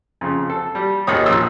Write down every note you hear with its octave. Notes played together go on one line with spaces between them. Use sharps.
F2 C#3
A4
G3
D#2 G#2 D#3 D#4 C#5 D#6
A#1 E6